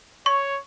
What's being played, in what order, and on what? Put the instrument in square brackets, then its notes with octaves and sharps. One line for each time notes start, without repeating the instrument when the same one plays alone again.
[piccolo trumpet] C#5 [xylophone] C#6